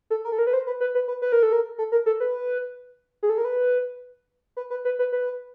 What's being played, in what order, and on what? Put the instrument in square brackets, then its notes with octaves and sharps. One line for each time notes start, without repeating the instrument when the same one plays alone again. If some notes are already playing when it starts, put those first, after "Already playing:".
[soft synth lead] A4
A#4
A4
A#4
B4
C5
B4
B4
B4
B4
B4
A#4
A4
A#4
A4
A#4
A4
B4
G#4
A4
A#4
B4
B4
B4
B4
B4
B4